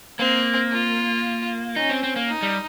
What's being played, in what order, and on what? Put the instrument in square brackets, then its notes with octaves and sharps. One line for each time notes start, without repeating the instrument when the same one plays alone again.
[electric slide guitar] A#3 [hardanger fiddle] C4
[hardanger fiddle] F4
[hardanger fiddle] C#4 [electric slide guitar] D#4
[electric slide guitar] C4
C4
A#3
[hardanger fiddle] D#4
[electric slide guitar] G3